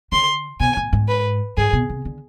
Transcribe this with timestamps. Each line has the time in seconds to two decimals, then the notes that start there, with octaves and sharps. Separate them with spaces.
0.12 D3 C6
0.60 B2 G#5
0.77 A2
0.93 G#2
1.08 B4
1.57 G#2 G#4
1.73 B2
1.90 C3
2.05 D3